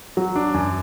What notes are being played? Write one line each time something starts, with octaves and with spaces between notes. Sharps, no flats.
F#3
D4
F#2